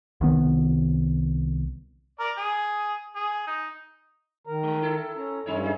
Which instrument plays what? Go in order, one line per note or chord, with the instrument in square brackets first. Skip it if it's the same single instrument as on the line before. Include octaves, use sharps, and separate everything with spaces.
[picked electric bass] C2 D#3 B3
[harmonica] A#4 D5
G#4
G#4
D#4
[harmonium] D#3 A#4 A#5
[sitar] G#3
E4 A4
[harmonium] C#4 A#5
[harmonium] G2 C#4 [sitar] G3 D#4 C#5
[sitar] D#4 G#4